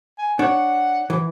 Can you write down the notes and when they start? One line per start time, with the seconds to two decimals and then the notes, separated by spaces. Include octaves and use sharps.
0.18 G#5
0.39 D4 C#5 F#5
1.10 E3